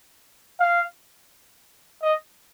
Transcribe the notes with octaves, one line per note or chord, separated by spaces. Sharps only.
F5
D#5